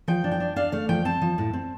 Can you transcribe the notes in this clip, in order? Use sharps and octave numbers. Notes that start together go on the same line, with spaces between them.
F3 G5
D4
G5
D4
D4 F5
A3 F5
F3 G5
C4 A5
F3
A2
C4